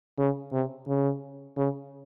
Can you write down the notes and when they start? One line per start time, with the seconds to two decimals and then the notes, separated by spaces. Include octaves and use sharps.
0.18 C#3
0.52 C3
0.88 C#3
1.57 C#3